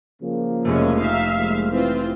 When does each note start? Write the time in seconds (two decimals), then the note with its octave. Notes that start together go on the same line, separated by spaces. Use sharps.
0.22 C#3 F3 A#3
0.65 F1 G#3 A3 C#4
1.00 D#4 E5 F5
1.38 F3 G#3 A#3
1.73 E3 C4 F4